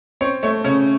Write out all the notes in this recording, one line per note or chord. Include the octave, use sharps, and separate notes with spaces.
C4 C#5
A3 C#5
C#3 C#5